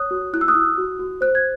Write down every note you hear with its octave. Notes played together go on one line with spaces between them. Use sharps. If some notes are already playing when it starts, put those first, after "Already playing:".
Already playing: C#5 D#6 F#6
F#4
E4 F#6
E6
D#6 F#6
E4
F#4
F#4
C5 F#6
G#6